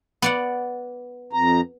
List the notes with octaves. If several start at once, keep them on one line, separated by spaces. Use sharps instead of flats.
B3 D5 F#5
F2 A#5